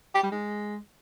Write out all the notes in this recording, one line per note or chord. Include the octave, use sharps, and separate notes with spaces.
G4
G3
G#3